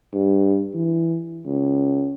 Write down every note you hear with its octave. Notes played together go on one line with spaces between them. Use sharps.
G2
E3
C#2